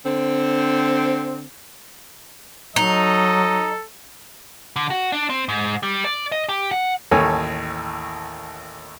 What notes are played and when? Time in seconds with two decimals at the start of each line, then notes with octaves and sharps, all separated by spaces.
0.06 D3 C4
2.76 F#3 D#4 A4 D#5
4.76 D3
4.90 F#4
5.12 D4
5.30 C4
5.49 G#2
5.83 G3
6.05 D5
6.32 D#5
6.49 G4
6.71 F#5
7.11 A1 D#2 A4 C#5 G#5